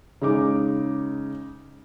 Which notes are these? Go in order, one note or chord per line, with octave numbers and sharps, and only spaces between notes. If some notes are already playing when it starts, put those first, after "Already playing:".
C#3 G#3 D#4 D6